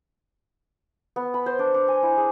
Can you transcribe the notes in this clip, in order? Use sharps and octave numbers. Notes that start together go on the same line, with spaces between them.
B3
B5
C5
D4
D4
G#5
E4
G#4